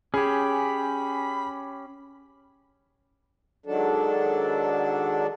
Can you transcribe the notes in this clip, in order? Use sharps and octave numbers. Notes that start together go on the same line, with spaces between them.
C#4 G4 G#4 B5
G#2 D#3 F#3 D4 A4